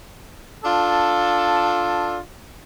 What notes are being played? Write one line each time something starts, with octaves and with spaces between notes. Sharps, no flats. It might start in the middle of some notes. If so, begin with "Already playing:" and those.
D4 F4 A4